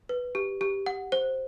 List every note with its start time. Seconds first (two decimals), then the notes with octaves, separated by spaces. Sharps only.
0.09 B4
0.35 G4
0.61 G4
0.86 F#5
1.12 C5